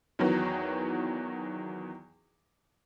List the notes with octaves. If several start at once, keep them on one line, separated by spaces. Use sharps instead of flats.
E2 D#3 E3 F#3